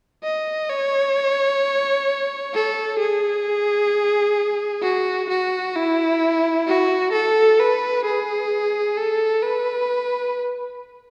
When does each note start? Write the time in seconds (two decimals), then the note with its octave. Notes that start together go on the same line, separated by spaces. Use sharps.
0.24 D#5
0.70 C#5
2.54 A4
2.99 G#4
4.83 F#4
5.30 F#4
5.76 E4
6.67 F#4
7.13 A4
7.60 B4
8.05 G#4
8.98 A4
9.43 B4